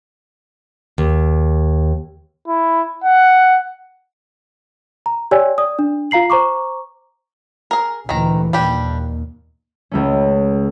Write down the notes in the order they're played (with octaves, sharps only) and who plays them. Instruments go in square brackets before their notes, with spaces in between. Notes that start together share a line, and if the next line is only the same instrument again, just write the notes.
[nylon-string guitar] D#2
[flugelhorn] E4
F#5
[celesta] A#5
G4 C#5 D5 G5 G#5 E6
D5 D#6
D4
F4 F5 A#5 C7 F#7
C5 A#5 C#6 D6
[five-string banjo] G#4 A#4
[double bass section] D2 A#2 E3 [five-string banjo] D#3 A#5
[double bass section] D#2 A#2 [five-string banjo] G3 D4 G4
[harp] C#2 A3 C#4